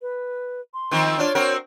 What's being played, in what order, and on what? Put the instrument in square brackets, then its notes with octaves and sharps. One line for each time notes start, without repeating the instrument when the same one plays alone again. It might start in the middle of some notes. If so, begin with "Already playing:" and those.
[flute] B4
C6
[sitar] D#3 F3 C4
[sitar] D4 F4 [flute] C#5
[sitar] C4 F#4 A#4